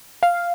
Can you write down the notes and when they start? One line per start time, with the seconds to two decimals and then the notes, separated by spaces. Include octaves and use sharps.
0.23 F5